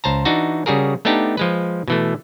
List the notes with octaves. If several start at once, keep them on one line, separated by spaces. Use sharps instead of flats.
C#2 C5 A5 A#5
E3 D4 D#4 F#4
C#3 G3 F#4 G#4 A#4
A3 B3 D4 D#4 G4
F3 G#3 B4
B2 E3 A3